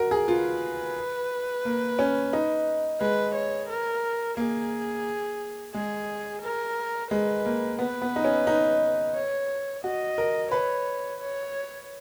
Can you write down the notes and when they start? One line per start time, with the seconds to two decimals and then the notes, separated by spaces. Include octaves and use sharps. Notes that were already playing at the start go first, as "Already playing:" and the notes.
Already playing: F#4 A#4
0.11 G#4
0.28 F4 B4
1.65 A#3
1.99 C#4
2.33 D#4
3.00 G#3 B4
3.35 C#5
3.69 A#4
4.37 A#3 G#4
5.74 G#3 G#4
6.42 A#4
7.10 G#3 B4
7.45 A#3
7.79 B3 B4
8.02 B3
8.16 D#4
8.24 C#4
8.47 D#4
9.15 C#5
9.84 F#4 D#5
10.18 A#4
10.51 B4 C#5
11.20 C#5